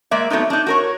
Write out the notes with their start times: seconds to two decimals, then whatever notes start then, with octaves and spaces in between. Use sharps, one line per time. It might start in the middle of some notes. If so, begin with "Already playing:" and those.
0.11 G#3 A#3 D5 E5
0.30 F#3 A3 B3 C4 D#4
0.50 D4 D#4
0.67 F#4 A#4 C#5